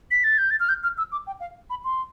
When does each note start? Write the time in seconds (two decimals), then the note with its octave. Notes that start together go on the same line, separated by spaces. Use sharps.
0.11 B6
0.24 A6
0.38 G6
0.51 A6
0.60 F6
0.69 G6
0.83 F6
0.98 E6
1.12 D6
1.27 G5
1.40 F5
1.70 B5
1.84 C6